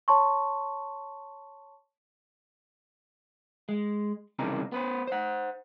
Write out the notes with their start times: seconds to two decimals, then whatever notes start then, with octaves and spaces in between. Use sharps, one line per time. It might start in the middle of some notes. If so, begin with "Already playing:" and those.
0.08 C#5 A5 C6 C#6
3.69 G#3
4.39 C2 C#3 E3 D4 D#4 A#4
4.72 B3 B4 C5
5.07 C5 F#5